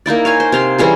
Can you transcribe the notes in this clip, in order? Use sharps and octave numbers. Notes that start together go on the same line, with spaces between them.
A#3 D#4 E4 D5
C#5 F5 G#5
C5
C3 F5 C6
E3 G3 C#4 G#4